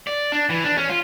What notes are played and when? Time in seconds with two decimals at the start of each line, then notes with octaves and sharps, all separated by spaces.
0.07 D5
0.32 D4
0.49 E3
0.64 D4
0.77 C#4
0.89 F4